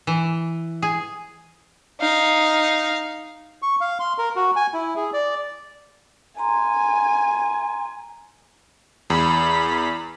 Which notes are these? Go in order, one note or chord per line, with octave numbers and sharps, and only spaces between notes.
E3
G#4
D#4 F5
C#6
F5
C6
A#4
F#4
G#5
E4
G#4
D5
G#5 A#5 C6
E2 B5